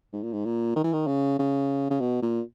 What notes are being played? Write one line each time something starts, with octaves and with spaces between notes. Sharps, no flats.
G#2
A#2
G#2
A#2
D#3
E3
D#3
C#3
C#3
C#3
B2
A#2